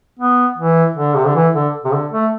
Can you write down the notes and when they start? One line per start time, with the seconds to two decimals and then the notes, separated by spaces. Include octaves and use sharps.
0.19 B3
0.58 E3
0.97 D3
1.15 C3
1.25 D3
1.35 E3
1.55 D3
1.85 C3
1.92 D3
2.12 A3